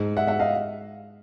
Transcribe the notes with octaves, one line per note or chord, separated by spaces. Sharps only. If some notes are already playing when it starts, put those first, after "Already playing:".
Already playing: G#2
E5 F#5
E5 F#5
D#5 F5